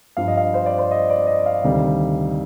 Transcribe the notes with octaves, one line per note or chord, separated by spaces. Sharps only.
G2 F3 F5
D#5
F5
C5
D5
C5
D#5
D5
D#5
F5
D2 C3 D#3 G3